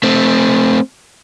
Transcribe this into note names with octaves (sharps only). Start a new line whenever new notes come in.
A3 C4